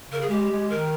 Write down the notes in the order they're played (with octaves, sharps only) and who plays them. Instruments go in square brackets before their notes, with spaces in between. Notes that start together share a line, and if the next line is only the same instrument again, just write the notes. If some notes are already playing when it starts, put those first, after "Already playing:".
[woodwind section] C#3 [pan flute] A#4
[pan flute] G#4
[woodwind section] G#3 [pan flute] G4
[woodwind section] G#3
[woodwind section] D#3 [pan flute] A#4